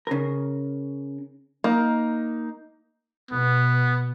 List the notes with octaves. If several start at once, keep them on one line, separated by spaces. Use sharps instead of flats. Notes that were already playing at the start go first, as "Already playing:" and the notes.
C#3 A#4
A#3 D#4
B2 B3